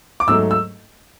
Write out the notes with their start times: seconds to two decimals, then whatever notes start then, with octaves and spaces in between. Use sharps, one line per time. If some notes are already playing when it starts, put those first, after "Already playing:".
0.20 D6
0.27 G#2 F#3 A3 E6
0.51 E6